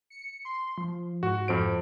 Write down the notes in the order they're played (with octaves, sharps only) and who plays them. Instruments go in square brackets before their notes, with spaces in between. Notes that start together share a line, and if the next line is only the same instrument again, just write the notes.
[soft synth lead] C#7
C6
F3
[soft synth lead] G#2 [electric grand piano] F#4
[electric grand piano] F2 C5 D7